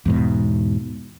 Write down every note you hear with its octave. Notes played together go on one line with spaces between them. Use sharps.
E2 G#2 B2